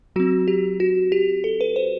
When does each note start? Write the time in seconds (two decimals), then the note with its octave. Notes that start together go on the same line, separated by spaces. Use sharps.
0.16 F#3 C4 F#4
0.48 G4
0.80 F#4
1.12 G4
1.44 A4
1.61 B4
1.76 C5